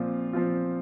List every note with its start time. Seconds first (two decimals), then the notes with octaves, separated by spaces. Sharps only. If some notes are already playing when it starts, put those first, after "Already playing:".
Already playing: A#2 F3 C4 F4
0.33 A#2 F3 C4 F4